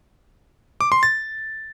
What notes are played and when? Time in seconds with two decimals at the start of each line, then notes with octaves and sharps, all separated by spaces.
0.81 D6
0.92 C6
1.03 A6